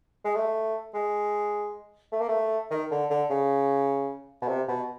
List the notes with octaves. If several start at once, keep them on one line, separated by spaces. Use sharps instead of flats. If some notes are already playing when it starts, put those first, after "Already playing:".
G#3
A3
G#3
A3
A#3
A3
D#3
D3
D3
C#3
B2
C3
B2